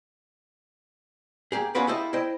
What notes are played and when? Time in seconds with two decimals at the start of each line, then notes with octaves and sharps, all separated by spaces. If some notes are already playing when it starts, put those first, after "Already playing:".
1.52 A#3 G4 G#4
1.75 B3 C#4 F4 F#4 B4 D5
1.87 E4 F4 G4 A4 D#5 E5
2.13 E4 C5 D#5 G5